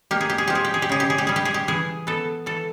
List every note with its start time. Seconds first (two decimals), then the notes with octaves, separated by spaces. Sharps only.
0.11 A#3 G4
0.21 G#4
0.30 G4
0.38 G#4
0.48 F3 G4
0.55 G#4
0.65 G4
0.74 G#4
0.82 G4
0.89 C#3 G#4
1.00 G4
1.10 G#4
1.18 G4
1.27 G3 G#4
1.36 G4
1.45 G#4
1.54 G4
1.68 E3 G#4
2.07 B3 A4
2.46 E3 A4